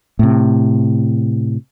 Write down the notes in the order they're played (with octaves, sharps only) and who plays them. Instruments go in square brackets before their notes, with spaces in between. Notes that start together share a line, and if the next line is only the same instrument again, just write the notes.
[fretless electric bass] A2 C3